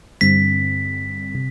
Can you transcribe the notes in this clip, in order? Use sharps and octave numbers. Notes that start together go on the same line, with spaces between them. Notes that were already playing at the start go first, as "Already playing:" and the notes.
G2 D3 G3 C4 B6
C3